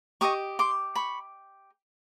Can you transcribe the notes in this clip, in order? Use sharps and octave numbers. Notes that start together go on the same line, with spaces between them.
G4 C5 D#5 C#6 D#6
C6 D6
B5 C#6